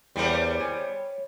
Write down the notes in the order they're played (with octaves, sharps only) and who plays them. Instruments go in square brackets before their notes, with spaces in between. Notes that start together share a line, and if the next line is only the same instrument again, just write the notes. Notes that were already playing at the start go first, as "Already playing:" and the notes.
[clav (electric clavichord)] E2 A#4 [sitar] G3 B3 C5 [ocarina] C#5
[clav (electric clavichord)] G#5